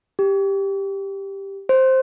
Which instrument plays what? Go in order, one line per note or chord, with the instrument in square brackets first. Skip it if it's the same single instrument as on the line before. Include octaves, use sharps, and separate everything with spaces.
[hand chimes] G4
C5